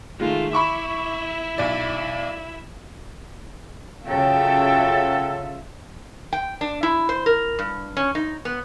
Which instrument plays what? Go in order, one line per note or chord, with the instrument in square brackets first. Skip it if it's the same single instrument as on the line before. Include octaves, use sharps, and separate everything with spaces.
[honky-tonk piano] D#3 G#3 [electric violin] A3 F4
[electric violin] E4 E5 [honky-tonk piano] B5 C#6 D6
[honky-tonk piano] B1 D5
[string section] C#3 [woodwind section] F#3 A4 [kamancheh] F4 E5 [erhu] G5
[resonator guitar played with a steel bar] G5
D4
E4
C5
A#4
G2
C#4
D#4
B3